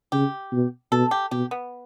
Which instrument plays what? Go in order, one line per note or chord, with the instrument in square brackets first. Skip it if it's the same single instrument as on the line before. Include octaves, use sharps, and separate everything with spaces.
[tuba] C#3 [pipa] G4
[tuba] B2
[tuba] B2 [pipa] A4
[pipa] G4
[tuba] B2 [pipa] G4
[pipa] B3